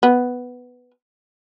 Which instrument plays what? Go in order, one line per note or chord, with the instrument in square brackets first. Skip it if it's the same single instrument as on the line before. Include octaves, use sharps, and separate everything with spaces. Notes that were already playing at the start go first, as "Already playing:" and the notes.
[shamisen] B3